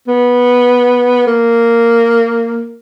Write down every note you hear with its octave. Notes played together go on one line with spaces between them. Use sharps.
B3
A#3